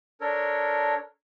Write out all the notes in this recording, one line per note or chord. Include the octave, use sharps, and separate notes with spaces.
D4 A4 A#4 C#5